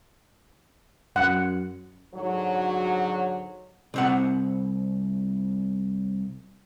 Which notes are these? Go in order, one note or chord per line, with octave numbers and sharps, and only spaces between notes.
F#2 F#5
G#2 D3 F#3
C2 C4 F#5